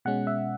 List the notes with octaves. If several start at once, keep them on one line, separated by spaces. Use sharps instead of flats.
B2 G#3 C#4 F#5
E5